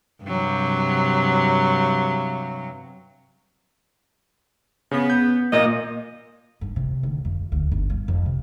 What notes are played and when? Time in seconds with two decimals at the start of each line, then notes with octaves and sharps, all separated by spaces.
0.23 G2 C3 F#3
4.91 C#3 B3
5.10 G6
5.53 A#2 A#3 D#5
6.61 G2
6.76 C3
7.03 D2
7.25 F2
7.52 D2
7.72 G1
7.90 G3
8.08 F2
8.26 C3